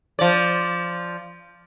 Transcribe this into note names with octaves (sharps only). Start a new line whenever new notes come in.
F3 D5